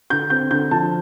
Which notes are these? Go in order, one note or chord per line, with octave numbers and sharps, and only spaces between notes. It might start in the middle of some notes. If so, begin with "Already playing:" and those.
D3 G6
C4 G6
D3 G6
F3 A5